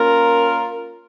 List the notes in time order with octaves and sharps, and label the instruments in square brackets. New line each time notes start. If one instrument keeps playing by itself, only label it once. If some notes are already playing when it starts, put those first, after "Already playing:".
Already playing: [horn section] A#3 C#4 F4 A#4